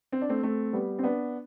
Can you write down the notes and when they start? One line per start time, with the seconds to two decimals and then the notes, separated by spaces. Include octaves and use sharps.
0.12 C4
0.22 D4
0.29 A3 C4
0.43 A3 C4
0.73 G3 B3
0.99 C4
1.03 B3 D4